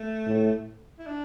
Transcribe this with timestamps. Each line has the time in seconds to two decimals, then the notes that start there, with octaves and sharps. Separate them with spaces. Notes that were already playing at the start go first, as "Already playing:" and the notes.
Already playing: A3
0.26 A2
0.99 E4
1.06 D4